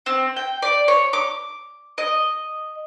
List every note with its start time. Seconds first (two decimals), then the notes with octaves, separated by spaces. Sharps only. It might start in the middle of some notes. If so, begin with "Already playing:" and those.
0.06 C4
0.36 G5
0.62 D5
0.88 C#5
1.13 D6
1.98 D#5